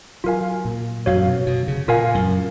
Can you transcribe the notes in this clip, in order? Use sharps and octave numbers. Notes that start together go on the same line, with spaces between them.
F#3 F4 A#4 F5 G#5
A#2
F#2 F#4 C#5 F5
B2
B2
C#3
A#2 F4 A#4 F5 G#5
F#2